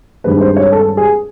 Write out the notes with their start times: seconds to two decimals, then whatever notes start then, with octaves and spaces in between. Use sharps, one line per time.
0.24 G2 D#3 G#3 C4 B4
0.41 C5
0.57 C#5
0.72 A4
0.97 G#4